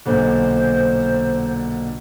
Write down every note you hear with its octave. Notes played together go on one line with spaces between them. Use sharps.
B1 A#2 D3 C5